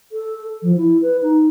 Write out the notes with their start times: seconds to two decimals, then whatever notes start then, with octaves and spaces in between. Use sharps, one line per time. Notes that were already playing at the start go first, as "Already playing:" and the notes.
0.12 A4
0.63 F3
0.77 E4
1.02 B4
1.23 D#4